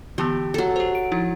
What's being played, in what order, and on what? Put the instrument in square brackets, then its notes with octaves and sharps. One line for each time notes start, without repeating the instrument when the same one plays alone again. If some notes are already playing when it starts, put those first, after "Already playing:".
[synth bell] D3 E3 B3 [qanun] G4
[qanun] F#3 A4
[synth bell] G4 C5
D7
F3 D#4 E4